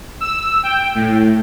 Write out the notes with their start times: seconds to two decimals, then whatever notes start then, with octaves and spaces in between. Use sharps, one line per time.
0.21 E6
0.63 G5
0.95 A2